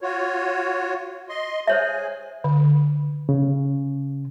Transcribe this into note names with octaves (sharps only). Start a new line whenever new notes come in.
F4 F#4 C#5
D#5 C6
G#4 C5 C#5 E5 G#5
D3
C#3